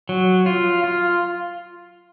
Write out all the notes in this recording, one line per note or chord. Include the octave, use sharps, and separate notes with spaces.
F#3
F4
F4